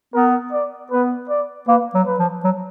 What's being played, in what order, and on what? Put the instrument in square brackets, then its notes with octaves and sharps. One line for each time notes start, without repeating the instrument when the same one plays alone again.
[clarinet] B3 [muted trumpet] A#4
[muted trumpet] D5
[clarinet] B3 [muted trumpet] B4
[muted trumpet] D5
[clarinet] A#3 [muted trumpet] B4
[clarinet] F#3
[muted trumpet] B4
[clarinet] F3
F#3